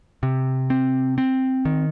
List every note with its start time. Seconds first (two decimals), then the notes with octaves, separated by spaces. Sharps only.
0.23 C3
0.70 C4
1.18 C4
1.65 D#3